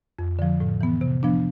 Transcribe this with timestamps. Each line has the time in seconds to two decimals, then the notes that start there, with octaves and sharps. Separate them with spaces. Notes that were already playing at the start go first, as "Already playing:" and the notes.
0.19 F2
0.39 D3 F3
0.60 A2
0.81 E3 B3
1.01 C3
1.23 F3 B3 D4